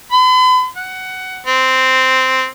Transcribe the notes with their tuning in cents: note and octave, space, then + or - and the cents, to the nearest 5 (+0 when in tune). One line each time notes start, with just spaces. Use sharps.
B5 +45
F#5 +15
C4 -5